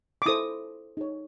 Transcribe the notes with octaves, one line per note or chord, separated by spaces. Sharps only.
D6
E4 A4 C5 D#6
D#4 G#4 C#5